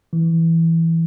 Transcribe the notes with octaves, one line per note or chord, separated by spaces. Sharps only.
E3